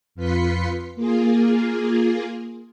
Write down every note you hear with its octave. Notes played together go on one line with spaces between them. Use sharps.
F2 F4 B4 C6 B6 C#7
A#3 F4 G#4